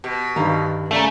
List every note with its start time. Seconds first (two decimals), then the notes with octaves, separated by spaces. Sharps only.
0.04 B2 G4
0.36 G2 D3 D#3 G4 F5 A#5
0.91 C#3 A3 D5 A#5